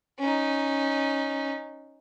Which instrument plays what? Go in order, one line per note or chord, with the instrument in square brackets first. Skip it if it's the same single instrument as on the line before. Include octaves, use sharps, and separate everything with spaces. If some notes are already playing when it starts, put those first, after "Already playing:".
[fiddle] C#4 D#4